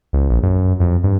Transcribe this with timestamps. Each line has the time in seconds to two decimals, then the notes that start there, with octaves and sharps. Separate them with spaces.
0.13 C#2
0.30 A#1
0.43 F#2
0.80 F2
1.04 G2